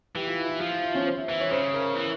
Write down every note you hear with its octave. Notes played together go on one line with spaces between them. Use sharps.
E3 G4
F4
E4
E4
F3 F4
E4
E4
C#4
C5
E5
E3 E5
C#5
C#3 C5
A#4
E3